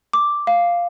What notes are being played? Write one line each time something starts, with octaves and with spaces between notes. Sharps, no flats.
D6
F5